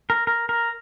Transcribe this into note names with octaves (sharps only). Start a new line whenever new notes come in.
A#4
A#4
A#4